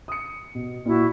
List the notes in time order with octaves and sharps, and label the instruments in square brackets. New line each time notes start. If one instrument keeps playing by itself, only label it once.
[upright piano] D#6 C#7
B2
[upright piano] A#2 [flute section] E4 F#4